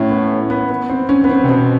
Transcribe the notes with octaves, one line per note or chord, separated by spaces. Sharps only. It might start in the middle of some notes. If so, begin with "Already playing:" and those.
Already playing: A2 C#4
B3
B3
B3
C4
C#4
B3
C4
C3
B2 C4